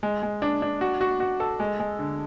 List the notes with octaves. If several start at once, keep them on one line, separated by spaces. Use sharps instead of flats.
G#3
G#3
D4
D4
F#4
F#4
F#4
A4
G#3
G#3
D3